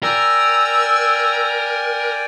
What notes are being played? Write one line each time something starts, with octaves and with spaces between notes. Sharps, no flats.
A#4 D5 G5 G#5 E6